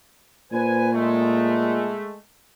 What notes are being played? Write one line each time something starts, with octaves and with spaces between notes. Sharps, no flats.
A#2 B4 C5 G#5
G#3 A3